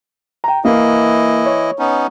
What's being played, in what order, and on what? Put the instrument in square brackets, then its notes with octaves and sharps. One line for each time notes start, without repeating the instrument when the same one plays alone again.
[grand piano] G5 A#5
[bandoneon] E3 E4 D#5 [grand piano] A#3
[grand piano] C#5
[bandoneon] B3 C#4 D#4